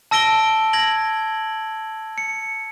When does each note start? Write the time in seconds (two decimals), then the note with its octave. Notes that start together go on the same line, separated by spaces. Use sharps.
0.11 A5 E6 A#6 D7 G7
0.73 G#6 A#6 F#7
2.18 C#7